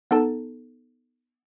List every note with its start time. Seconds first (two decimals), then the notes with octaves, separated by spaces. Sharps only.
0.11 B3 D#4 A4 A5